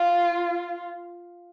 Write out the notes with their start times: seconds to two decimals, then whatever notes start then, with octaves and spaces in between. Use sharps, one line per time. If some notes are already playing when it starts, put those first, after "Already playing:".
Already playing: F4